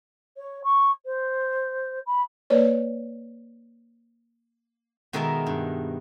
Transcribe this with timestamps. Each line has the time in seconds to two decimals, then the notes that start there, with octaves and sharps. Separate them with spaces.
0.37 C#5
0.64 C#6
1.05 C5
2.06 B5
2.50 A#3 B4 C#5 D5
5.13 B2 D#3 G#3 A#4 E5 A5
5.47 G2